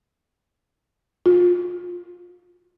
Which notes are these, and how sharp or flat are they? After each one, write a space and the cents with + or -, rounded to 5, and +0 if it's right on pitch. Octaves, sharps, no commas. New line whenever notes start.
F4 +25